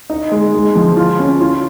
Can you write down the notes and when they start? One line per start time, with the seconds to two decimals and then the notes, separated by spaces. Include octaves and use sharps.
0.10 D#4
0.31 G#3
0.54 G#3
0.75 F3
0.97 F4
1.19 C#4
1.41 F4